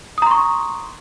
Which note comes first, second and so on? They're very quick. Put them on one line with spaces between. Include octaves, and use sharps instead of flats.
D#6 A#5 C6 C#6